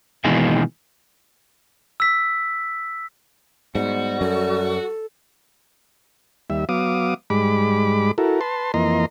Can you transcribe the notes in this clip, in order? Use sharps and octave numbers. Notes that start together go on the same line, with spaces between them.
B2 D#3 E3 G#3 A#3
E6 B6
G#2 G3 B3 F#4
F#2 A4
D#2 G3 E5
F#3 B3 F5 D6 D#6
G#2 G3 G#3 B5 D6
E4 F#4 A4 A#4
B4 A5 C6
F2 E3 A#3 D#5 A#5 C6